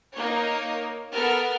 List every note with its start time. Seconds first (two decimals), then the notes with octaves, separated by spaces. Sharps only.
0.13 A#3 D#4 C#5
1.12 B3 A4 A#4 F#5 F6